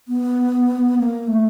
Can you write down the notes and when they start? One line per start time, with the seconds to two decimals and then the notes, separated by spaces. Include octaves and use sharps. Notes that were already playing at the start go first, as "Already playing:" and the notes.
0.08 B3
0.98 A#3
1.27 A3